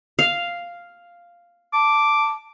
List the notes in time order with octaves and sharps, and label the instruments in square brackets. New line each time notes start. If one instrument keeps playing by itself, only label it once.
[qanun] F5
[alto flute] A5 [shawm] D6